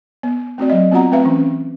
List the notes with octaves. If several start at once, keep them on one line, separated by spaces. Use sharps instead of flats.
B3
A3 C4 F#4 D5
F#3 D#5
B3 C4 F4 F#4 F#5 A#5
A3 C4 B4 E5 F5
E3 C#4